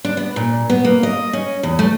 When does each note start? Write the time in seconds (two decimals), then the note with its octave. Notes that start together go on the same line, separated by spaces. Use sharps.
0.05 D4
0.17 B3
0.36 A#2
0.70 B3
0.85 A#3
1.03 D#5
1.33 C#4
1.63 E2
1.79 A3